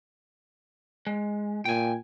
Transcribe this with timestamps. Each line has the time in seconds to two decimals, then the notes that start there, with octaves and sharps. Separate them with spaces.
1.07 G#3
1.65 A#2 G5 G#5